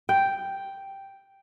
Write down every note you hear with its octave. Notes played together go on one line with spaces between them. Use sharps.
G5